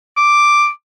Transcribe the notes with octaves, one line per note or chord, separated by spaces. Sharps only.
D6